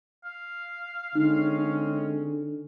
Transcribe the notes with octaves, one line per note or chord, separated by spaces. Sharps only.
F5
D3 G#3 C4 C#4 D#4